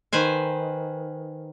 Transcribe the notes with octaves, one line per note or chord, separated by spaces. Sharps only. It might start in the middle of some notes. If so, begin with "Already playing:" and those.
D#3 B4 C5 G#5